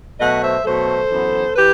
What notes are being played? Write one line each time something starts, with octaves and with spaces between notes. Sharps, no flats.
B2 F#3 A3 D#5 F#5
C5 E5
B2 F#3 A3 A4 C5
F#2 E3 B3
E3 G4 B4